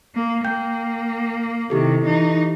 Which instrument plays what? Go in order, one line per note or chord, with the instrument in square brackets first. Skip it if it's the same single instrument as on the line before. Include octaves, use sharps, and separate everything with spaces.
[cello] A#3
[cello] A#3 [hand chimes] G5 G6
[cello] C3 D#3 [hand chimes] E4 G4 A4
[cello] E3 D#4